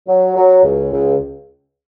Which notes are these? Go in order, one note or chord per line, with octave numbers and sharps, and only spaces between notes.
F#3
F#3
C#2
C#2